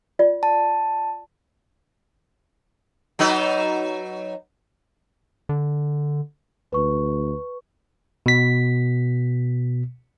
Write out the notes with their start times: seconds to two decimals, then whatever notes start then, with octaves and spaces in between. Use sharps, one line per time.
0.19 F4 D5
0.43 A5
3.19 F#3 D#4 B4
5.49 D3
6.73 D2 B4 C#6
8.26 B2 B6